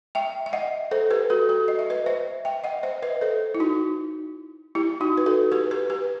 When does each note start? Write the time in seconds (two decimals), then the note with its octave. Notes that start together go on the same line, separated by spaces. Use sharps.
0.15 E5 G5
0.46 E5
0.53 D#5 F#5
0.91 A4 C5
1.11 G4 B4
1.30 F#4 A4
1.49 F#4 A4
1.68 D#5
1.79 E5
1.90 B4 D#5
2.06 C5 E5
2.45 E5 G5
2.64 D#5 F#5
2.83 C5 E5
3.03 B4 D#5
3.21 A4 C5
3.54 E4
3.60 D#4 F#4
4.75 E4 G4
5.01 D#4 F#4
5.18 B4
5.26 F#4 A4
5.52 G4 B4
5.71 G4 B4
5.90 G4 B4